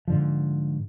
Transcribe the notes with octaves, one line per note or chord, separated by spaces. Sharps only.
G#2 D3 F3